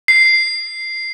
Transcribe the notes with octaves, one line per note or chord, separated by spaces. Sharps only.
C7